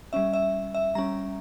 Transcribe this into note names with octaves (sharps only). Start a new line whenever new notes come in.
G3 C#4 E5
E5
E5
G3 C#4 A#5